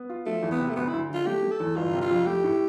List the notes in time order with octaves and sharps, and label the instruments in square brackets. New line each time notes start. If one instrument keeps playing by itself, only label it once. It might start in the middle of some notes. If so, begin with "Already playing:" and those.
Already playing: [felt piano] B3
F4
[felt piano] F3 [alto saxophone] A3
[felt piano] E2
[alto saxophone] B3
[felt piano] C3
[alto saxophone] A3
[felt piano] D2 [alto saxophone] B3
[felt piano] D2 [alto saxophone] E4
[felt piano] D3 [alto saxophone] F4
[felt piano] A3 [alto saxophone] G4
[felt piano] A3
[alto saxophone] A4
[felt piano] E2
[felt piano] G1 [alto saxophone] F4
[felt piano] C3
[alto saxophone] F4
[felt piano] F2
[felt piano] A3 [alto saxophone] G4
[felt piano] A2